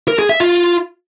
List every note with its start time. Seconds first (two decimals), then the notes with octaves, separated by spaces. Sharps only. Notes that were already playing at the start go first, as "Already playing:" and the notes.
0.08 A#4
0.19 G#4
0.29 E5
0.40 F4